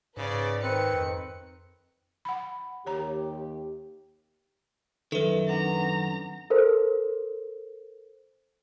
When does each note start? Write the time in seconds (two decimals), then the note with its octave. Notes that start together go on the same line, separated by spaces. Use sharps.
0.17 G#2 C#3 B4 D5
0.63 D#3 C4 B4 C#7
0.93 F2
2.25 F#5 B5
2.86 D#2 G4 C#5 A#5
5.12 F#2 D#3 A4 B4 E5
5.49 C4 D4 F#5 A#5
6.50 A4 A#4 C5